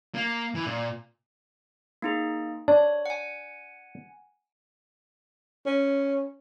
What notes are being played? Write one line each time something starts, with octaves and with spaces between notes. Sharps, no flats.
A#3
E3
A#2
A#3 D#4 G#4
D4 C#5
F#5 G#5
C#4